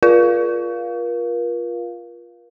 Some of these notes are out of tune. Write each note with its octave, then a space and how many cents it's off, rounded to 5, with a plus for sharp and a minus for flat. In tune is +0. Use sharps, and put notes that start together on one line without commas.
F4 +0 A#4 +40 F5 +0